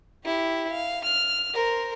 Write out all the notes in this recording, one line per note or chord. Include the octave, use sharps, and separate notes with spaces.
E4 G4
F5
F6
A#4 C5